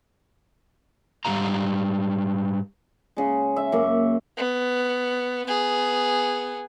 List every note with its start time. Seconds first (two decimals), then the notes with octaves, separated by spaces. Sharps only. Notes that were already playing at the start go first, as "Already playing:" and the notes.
1.25 G#2 G3 A#3 G#4 F5 A#5
3.17 C#3 G#3
3.56 E5
3.72 F#2 A#3
4.37 B3
5.46 B3 G#4